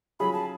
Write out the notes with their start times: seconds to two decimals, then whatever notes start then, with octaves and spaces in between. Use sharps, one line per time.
0.20 F#3 C#4 F4 G#4 B5
0.33 A5